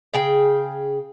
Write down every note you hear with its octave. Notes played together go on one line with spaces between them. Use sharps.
C#3 G#4 G5